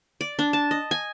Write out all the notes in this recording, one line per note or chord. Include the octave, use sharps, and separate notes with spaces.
D5
D4
A5
D#5
G#5